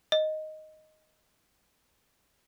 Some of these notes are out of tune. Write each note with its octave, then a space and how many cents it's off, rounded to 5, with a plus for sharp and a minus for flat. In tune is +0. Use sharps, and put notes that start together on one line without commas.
D#5 +0